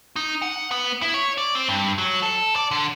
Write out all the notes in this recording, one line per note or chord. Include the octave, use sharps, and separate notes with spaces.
D#4
F#5
B3
E4
C#5
D5
C4
G2
F#3
A4
D5
D3